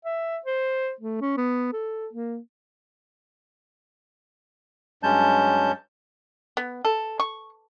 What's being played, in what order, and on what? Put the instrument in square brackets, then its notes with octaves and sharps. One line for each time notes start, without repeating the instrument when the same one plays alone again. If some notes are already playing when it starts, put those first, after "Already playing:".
[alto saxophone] E5
C5
A3
C#4
B3
A4
A#3
[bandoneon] G2 F#3 G#3 C#4 A5 G6
[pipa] B3
A4
C#6